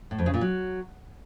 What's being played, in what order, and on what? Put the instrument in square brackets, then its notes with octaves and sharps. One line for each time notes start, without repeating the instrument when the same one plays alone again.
[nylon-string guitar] A2
F2
C#3
A#2
F#3